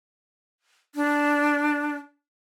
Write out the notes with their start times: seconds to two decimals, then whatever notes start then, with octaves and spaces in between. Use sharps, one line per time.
0.95 D4